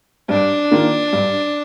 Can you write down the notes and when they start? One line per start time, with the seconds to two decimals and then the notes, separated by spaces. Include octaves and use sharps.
0.29 G2 D4
0.71 D#3 A#3 F4
1.13 G2